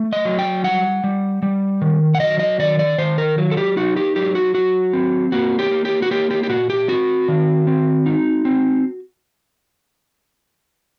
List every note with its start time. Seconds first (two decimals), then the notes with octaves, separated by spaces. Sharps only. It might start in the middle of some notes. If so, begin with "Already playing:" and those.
Already playing: A3
0.13 D#5
0.25 F#3
0.39 G5
0.64 G3 F#5
1.04 G3
1.43 G3
1.82 D#3
2.15 F#5
2.20 F#3 D#5
2.39 D#5
2.59 D#3 D5
2.79 D5
2.98 D#3 C5
3.18 A#4
3.38 F#3
3.51 A4
3.57 G4
3.77 D#4 F#4
3.96 G4
4.16 F#3 G4
4.35 F#4
4.55 F#3 F#4
4.93 C4
5.32 A#3 F#4
5.59 G4
5.71 A#3
5.85 G4
6.02 F#4
6.11 A#3 G4
6.31 G4
6.43 G4
6.49 A#2 F#4
6.70 G4
6.88 C4 F#4
7.28 D#3
7.67 C4
8.06 D#4
8.45 C4